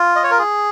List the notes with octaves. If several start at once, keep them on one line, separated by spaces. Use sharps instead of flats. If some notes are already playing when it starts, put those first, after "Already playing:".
Already playing: F4
D#5
C#5
A#4
G#4